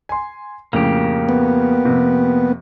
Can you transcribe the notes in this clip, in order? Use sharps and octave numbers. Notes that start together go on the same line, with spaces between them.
G#5 C6
F2 A2 C#3 A#3 G4
B3
F2 C3